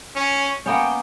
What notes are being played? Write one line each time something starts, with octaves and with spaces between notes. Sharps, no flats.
C#4
A#3 B3 C#4 G5